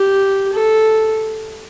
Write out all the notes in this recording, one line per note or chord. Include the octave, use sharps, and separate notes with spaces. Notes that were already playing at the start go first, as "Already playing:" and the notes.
Already playing: G4
A4